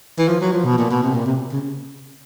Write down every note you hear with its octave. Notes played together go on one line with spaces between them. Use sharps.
E3
F3
F#3
F3
B2
A#2
B2
C3
A#2
C3
C#3